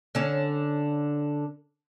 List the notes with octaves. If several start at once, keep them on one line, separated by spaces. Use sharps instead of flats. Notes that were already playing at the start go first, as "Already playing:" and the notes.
D3 C#4